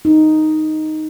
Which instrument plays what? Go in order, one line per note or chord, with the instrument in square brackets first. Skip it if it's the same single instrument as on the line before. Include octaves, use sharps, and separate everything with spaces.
[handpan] D#4